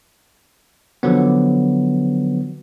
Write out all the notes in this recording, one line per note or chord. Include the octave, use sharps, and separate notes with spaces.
D3 F3 F#3 B3